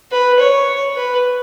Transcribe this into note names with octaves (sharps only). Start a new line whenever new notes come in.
B4
C#5
B4